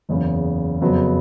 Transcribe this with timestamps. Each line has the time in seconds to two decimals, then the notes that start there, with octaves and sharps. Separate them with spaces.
0.09 F#1 E2 C#3
0.81 F2 C#3 F#3 B3